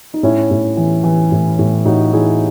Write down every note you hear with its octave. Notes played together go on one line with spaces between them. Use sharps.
D#4
A2 C#4 E4
A2
E3
E3
A2
A2
A2 D#4 F#4
E3 E4 G#4